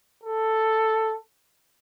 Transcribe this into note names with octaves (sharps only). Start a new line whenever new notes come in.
A4